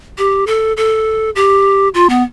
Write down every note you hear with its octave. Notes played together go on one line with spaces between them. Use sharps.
G4
A4
A4
G4
F4
B3